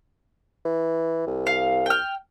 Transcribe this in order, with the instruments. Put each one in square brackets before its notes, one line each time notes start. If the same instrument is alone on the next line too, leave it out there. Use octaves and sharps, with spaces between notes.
[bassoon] E3
C2
[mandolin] F5
G5 F6